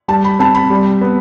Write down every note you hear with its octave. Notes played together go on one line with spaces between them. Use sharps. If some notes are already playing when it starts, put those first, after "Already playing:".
G3 A5
B5
C4 A5
B5
G3
B3